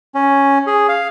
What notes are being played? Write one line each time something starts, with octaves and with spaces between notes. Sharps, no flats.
C#4
G#4
F5